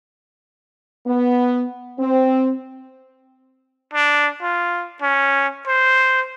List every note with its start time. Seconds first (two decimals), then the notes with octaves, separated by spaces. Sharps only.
1.07 B3
2.00 C4
3.94 D4
4.42 F4
5.02 C#4
5.67 C5